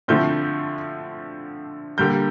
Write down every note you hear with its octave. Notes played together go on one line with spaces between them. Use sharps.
D3 F3 A3 C4 G6
D3 G3 A#3 G6